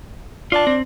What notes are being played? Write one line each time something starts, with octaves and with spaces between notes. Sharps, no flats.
D4 F4 A5
C4